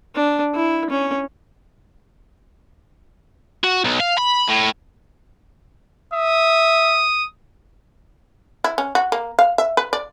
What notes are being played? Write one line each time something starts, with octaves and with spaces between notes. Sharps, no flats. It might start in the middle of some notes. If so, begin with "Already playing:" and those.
D4
E4
C#4
F#4
B1
F5
B5
A2
E5 D#6
E4
C#4
F#4
A#3
F5
E5
B4
D5